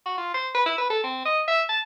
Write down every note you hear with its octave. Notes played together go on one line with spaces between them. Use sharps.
F#4
F4
C5
B4
E4
B4
A4
C4
D#5
E5
A5